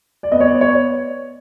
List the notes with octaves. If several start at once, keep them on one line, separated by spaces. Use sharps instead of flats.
D5
B3 D#5
C#5
D5
C#5